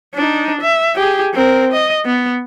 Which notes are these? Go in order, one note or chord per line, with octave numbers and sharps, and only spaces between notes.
D4 D#4
E5
G4 G#4
C4 A#4
D#5
B3